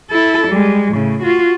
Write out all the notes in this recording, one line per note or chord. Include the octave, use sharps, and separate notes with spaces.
E4 A4
G3 G#3
A2 C#3
F4 F#4